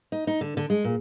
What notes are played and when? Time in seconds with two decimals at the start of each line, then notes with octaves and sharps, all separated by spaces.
0.12 D#4
0.27 D#4
0.41 D3
0.57 D3
0.70 G#3
0.84 A#2